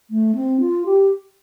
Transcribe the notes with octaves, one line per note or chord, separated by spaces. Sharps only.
A3
C4
F4
G4